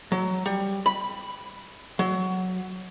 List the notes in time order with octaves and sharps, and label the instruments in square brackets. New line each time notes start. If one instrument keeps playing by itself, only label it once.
[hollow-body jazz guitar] F#3
G3
B5
F#3